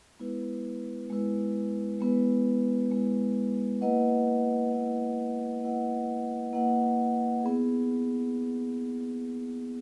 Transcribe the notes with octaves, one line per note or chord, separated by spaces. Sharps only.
G#3 B3 E4 B4
G#3 B3 E4 B4
G#3 B3 E4 B4
G#3 B3 E4 B4
A#3 E4 B4 D#5 F#5
A#3 E4 B4 D#5 F#5
A#3 E4 B4 D#5 F#5
A#3 E4 B4 D#5 F#5
B3 E4 G#4